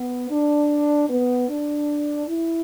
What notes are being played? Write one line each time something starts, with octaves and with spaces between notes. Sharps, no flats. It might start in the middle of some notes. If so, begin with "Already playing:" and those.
Already playing: B3
D4
B3
D4
E4